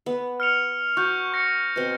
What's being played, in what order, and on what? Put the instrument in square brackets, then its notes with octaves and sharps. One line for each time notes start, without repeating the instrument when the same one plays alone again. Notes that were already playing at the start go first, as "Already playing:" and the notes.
[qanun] B3
[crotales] F6 C#7 F7
[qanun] F#4 [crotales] C#6 F#6 G6
[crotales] C#6 A#6 C#7
[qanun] B2 C4